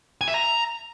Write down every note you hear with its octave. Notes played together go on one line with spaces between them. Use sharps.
G#5
E5
A#5